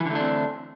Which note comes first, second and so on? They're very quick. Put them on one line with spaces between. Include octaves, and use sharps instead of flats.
E3 D3 A3 D4 C4